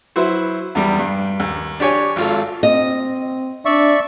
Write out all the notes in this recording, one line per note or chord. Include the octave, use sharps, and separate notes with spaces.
F#3 E4 B4 C5
E2 G3
G2
D#2
D4 G4 C#5 G#5
G#1 F4 A4
C4 D#5
D4 D5 E5 C#6